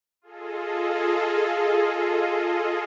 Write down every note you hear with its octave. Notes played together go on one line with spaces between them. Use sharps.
F4 G#4 A4 D#5